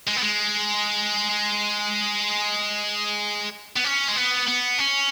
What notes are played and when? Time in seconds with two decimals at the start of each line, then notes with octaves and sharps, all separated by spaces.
0.08 G#3
0.17 B3
0.23 G#3
3.76 B3
3.85 C#4
4.09 G#3
4.16 B3
4.48 B3
4.79 C#4